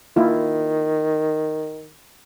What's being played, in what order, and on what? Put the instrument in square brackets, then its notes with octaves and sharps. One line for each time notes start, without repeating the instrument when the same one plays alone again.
[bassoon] D#3 [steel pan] A#3 E4 F4